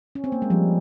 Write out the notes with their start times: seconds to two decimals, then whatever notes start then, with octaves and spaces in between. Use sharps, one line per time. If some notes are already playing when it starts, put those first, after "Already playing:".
0.15 C#4
0.24 C4
0.32 A#3
0.42 G#3
0.50 F3 G3